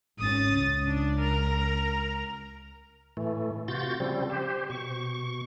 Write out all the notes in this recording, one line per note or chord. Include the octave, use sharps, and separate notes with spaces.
G#1 C#4 D#6 A6
C#2
D4
A#4 A#5
A2 E3 A3
C3 F4 F#4 G6 A6
C#3 F3 G3 C4
G4 C5
B2 C#6